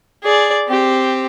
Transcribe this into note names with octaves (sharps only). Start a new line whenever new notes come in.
G#4 D5
C4 G4